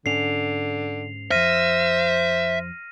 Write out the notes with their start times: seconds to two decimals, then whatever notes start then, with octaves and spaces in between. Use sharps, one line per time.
0.06 G#2 D3 C#4 C7 F7
1.31 F2 F3 C5 E5 F6 A#6 D#7